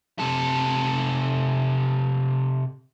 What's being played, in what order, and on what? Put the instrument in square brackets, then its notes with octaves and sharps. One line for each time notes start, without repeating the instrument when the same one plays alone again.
[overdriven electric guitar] C3 A4